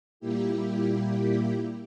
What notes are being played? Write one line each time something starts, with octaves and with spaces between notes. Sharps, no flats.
A#2 G3 A#3 E4 G4